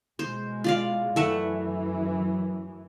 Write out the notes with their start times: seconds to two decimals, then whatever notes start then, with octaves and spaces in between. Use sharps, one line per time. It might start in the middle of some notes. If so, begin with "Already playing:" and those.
0.19 B2 G#3 C5
0.64 F4 D5 F5
1.16 F#2 E3 A3 E5 F#5